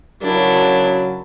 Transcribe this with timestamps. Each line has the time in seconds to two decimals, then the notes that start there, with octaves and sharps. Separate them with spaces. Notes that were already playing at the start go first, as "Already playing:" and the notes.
0.22 C#3 F#3 D4 E4 A#4